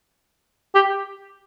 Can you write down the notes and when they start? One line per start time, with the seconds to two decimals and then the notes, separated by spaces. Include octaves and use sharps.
0.75 G4